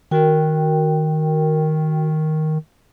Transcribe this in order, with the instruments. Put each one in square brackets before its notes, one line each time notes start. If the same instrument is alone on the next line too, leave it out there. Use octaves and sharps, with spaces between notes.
[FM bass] D#3 [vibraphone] F#4 A#4 G5